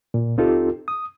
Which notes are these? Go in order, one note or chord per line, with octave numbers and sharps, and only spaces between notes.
A#2
C#2 C4 D#4 F4 G4 A4
D#6